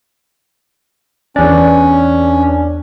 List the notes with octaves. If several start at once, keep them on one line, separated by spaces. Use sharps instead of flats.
E2 C#4 D4